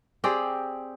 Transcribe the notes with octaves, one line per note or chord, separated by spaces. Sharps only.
C4 G4 G#4 D5